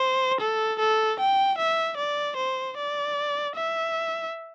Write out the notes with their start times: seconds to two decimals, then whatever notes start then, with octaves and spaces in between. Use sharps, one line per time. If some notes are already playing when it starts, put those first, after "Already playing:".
Already playing: C5
0.41 A4
0.80 A4
1.19 G5
1.58 E5
1.98 D5
2.37 C5
2.77 D5
3.56 E5